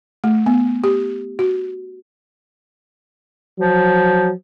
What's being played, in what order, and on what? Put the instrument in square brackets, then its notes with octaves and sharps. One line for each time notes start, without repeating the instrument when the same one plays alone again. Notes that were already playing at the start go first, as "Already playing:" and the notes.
[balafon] A3
B3
G4
F#4
[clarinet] F3 [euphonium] F#3